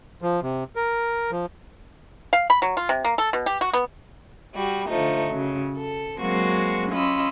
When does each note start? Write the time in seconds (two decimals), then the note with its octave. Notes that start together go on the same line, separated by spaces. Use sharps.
0.22 F3
0.43 C3
0.76 A#4
1.31 F3
2.33 F5
2.50 B5
2.62 F#3
2.77 F4
2.89 C3
3.05 A#3
3.18 A4
3.33 B2
3.46 G4
3.61 F#4
3.73 B3
4.54 G3 F#4
4.87 D3 F3 A3 D#4
5.31 C#3 F#3
5.77 A4
6.20 F#3 G#3 A#3 C4 F#4
6.92 C#4 F4 D#5 B5 E6